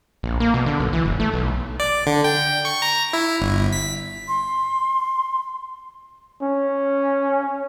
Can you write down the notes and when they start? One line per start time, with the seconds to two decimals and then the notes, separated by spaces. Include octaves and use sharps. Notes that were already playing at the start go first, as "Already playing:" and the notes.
0.23 A#1
0.40 A#3
0.54 B2
0.66 D3
0.80 B1
0.93 E3
1.05 F#1
1.20 A3
1.34 B1
1.80 D5
2.07 D3
2.24 G5
2.65 C#6
2.82 A#5
3.13 E4
3.40 G1
3.73 B6
4.28 C6
6.42 C#4